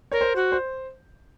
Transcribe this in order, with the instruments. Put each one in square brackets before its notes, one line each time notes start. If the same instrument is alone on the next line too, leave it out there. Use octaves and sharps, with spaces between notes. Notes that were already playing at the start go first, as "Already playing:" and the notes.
[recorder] A#4 [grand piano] C#5
[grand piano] C5
[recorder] F#4
[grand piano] C5